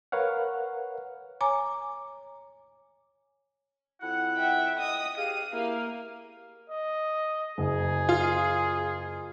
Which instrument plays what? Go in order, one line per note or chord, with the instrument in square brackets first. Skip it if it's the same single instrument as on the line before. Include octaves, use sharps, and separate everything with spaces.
[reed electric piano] A#4 B4 C#5 F5 F#5
[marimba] C#5 G#5 A#5 D6
[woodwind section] F2 E4 F#5
[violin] E5 G5
D#5 D#6
[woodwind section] G4 G#4 F5 [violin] D#7
[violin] A#3 [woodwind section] E4 G4 F5
[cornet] D#5
[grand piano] F#1 [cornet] G#4
[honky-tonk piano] F4